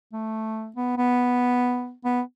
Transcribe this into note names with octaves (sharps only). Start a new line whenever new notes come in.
A3
B3
B3
B3